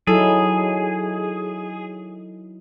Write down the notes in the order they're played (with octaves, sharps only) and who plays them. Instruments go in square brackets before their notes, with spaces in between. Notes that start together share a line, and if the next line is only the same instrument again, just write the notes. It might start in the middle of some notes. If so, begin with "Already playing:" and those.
[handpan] F#3 D#4 E4 [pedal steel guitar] G#4 [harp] A4